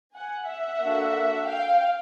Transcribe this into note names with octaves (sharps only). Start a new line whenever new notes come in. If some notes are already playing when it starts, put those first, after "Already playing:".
F#5 G#5
E5 F#5
A#3 D4 F#4 A4
F5 G5